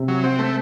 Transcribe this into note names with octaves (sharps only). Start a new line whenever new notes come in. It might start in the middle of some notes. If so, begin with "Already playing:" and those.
Already playing: C3
F#3
C4
A3